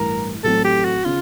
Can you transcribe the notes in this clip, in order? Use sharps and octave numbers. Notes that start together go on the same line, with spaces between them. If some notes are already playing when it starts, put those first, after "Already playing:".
Already playing: A1 G2 E3 A#4
A1 A2 F#3 A3 C4 A4
G4
F#4
C#3 F4